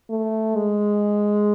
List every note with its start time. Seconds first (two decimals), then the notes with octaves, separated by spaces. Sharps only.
0.10 A3
0.56 G#3